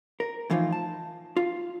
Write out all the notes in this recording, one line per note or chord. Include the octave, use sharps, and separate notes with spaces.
A#4
A2 E3 F3 D#4 F4
A5
F4